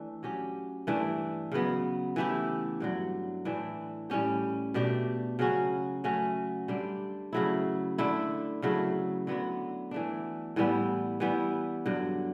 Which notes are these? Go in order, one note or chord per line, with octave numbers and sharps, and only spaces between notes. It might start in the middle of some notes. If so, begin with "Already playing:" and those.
Already playing: E3 A3 D4
F#3 C#4 G4
G2 E3 A3 D4
C#3 F#3 B3
E3 A3 E4 G4
G2 D3 F#3
A2 E3 A3 D4
A2 G3 C#4 G4
B2 A3 D4 G4
C#3 F#3 C#4 F#4
F#3 A3 C#4 F#4
D3 G3 D4
C#3 F#3 A3 E4
D3 A3 E4
C#3 F#3 A3 E4
D3 F#3 B3 F#4
E3 A3 D4
A2 E3 G3 B3
E3 G3 B3
G2 D3 F#3